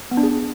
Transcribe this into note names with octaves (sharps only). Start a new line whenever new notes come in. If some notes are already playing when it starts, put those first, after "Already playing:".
B3
D4
G#4